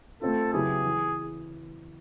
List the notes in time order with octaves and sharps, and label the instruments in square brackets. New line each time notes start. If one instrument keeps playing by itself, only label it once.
[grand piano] A3 C4 F4 [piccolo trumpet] A4
[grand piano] C#3 F#3 B3 E4 G4 [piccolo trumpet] G#4
[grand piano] E3